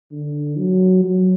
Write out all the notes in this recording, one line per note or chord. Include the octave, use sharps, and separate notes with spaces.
D3
F#3
F#3